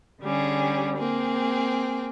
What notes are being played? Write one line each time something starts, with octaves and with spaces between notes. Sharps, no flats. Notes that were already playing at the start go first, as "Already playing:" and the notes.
D3 G3 C#4 G#4
A#3 C4 G#4